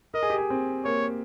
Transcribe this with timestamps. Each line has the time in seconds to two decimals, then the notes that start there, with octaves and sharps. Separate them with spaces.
0.14 A#4 D#5
0.23 G#4
0.30 G4
0.38 G#4
0.50 C4
0.85 A#3 C#5